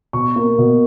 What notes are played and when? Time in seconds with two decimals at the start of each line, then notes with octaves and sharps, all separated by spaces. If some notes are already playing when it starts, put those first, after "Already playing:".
0.13 B2 C#6
0.36 A#3
0.58 B2